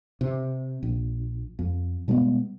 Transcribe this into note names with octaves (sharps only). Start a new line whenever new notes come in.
C3
A#1
F2
B2 G3 G#3 B3